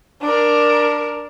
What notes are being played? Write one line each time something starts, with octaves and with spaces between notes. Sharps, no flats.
D4 A#4